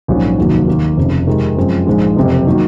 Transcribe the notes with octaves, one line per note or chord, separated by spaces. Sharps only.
A#1 G#2 F#3 C#4 F#4
F1 D#2 D#3 F#3 A#3
D#2 D#3 A#3
F1 F2 C#3
F2 C3 D#3 G#3 D#4
F#2 F3 G#3 C4
A#1 G#2 F3 G#3
F#1 F2 C3
D#3 F#3 A#3